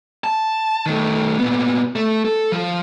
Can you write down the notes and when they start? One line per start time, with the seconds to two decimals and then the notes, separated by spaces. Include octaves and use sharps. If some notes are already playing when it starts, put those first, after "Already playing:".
0.24 A5
0.86 D#3 A3
1.39 A#2 B3
1.96 A3
2.25 A4
2.52 F3